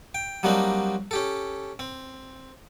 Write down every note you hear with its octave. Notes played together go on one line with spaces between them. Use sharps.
G5
F#3 G3 A#3 C4 D4 D#4
C#4 G4 A4
C4